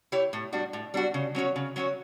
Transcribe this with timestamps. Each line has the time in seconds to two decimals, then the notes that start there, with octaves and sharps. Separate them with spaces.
0.12 E4 G4 C#5
0.33 A2
0.53 G3 D4 F#4
0.73 A2
0.94 G3 D4 F#4
1.14 C#3
1.35 F#3 C#4 F#4 C#5
1.56 C#3
1.76 F#3 C#4 F#4 C#5